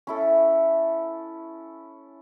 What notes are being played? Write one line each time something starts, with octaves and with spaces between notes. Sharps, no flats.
C#4 E4 A4